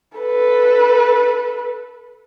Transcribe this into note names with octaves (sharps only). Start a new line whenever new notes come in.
A4 B4